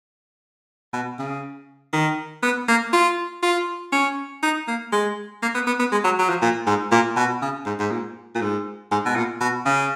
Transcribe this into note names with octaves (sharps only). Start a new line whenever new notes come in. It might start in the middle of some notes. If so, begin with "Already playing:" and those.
B2
C#3
D#3
B3
A#3
F4
F4
C#4
D#4
A#3
G#3
A#3
B3
B3
B3
G#3
F#3
F#3
F3
A#2
G#2
A#2
B2
C#3
G#2
G#2
A#2
A#2
G#2
G#2
B2
A#2
B2
C#3